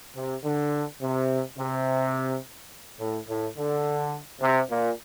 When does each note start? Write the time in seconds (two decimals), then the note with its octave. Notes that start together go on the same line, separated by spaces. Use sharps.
0.16 C3
0.44 D3
1.01 C3
1.58 C3
2.99 A2
3.28 A2
3.57 D3
4.41 C3
4.70 A#2